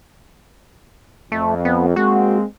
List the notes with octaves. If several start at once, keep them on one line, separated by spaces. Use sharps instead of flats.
F2 A3
B3
G#3 A#3 C4 F#4